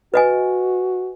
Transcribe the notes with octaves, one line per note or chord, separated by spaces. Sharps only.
F#4 B4 D#5 G#5